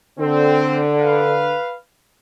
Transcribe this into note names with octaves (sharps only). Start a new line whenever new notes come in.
D3 C4
B4 F5